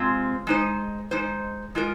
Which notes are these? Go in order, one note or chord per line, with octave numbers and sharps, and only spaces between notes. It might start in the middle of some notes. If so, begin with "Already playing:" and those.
Already playing: C3 G#3 C4 F4
G#3 D#4 C5
G#3 D#4 C5
G#3 F4 A#4